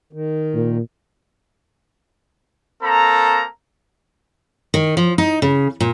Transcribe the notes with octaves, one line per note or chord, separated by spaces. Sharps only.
D#3
A#2
A#3 C4 A4 A#5
D#3
F3
D#4
C#3
A#2